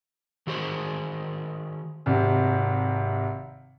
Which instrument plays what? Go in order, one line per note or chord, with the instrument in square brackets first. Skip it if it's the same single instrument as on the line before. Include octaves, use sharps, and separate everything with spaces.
[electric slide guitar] D#3 F#4 G#4 C5
[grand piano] G#1 C3